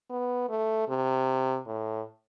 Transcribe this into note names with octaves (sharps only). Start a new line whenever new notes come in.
B3
A3
C3
A2